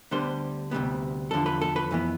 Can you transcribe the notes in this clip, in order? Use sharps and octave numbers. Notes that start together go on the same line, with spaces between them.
D2 D3 G3 B3 C5
D2 C3 G3 B3
E2 D3 F3 A4
B4
A4
B4
F2 E3 B3